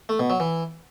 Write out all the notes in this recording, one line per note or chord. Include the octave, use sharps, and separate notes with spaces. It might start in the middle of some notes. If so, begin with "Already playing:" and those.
A3
B2
F#3
E3